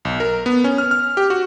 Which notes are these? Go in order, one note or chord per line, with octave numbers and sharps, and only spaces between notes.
B1
A#4
B3
C#4
F6
F6
G4
F#4